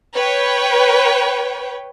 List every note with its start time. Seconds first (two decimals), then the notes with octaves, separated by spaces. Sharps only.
0.14 B4 C#5 G5